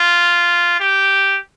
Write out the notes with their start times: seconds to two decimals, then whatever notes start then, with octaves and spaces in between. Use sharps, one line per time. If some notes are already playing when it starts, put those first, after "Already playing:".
Already playing: F4
0.80 G4